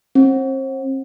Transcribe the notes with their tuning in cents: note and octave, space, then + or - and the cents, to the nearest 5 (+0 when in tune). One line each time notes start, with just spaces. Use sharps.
C4 +35